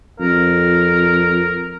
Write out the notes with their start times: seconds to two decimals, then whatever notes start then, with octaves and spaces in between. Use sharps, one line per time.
0.20 F2 A#4